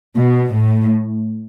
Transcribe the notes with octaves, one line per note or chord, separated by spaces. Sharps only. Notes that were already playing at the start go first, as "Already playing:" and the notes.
B2
A2